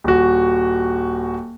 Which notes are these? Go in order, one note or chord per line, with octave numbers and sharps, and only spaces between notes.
D#1 F#4